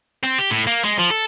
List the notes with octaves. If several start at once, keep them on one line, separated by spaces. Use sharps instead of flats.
C4
G4
A2
A#3
G#3
F3
A4